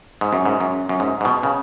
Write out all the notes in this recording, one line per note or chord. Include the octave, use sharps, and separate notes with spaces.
G#2
F#2
G#2
F#2
F#2
G#2
G#2
B2
C#3